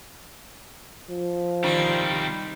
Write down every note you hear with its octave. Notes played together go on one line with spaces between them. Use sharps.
F3
D#3 G3 C4